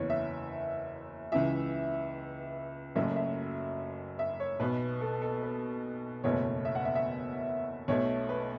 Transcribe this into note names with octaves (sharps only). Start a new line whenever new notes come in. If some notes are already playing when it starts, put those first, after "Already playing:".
Already playing: F#1 E2 E3 C#5
E5
C#2 C#3 E3 E5
F#1 F#2 F#3 A3 E5
E5
E5
C#5
B1 B2 B3 B4
A4
A4
B4
F#1 E2 B2 A3 C#5
E5
F#5
E5
E5
B1 B2 A3 C#5
B4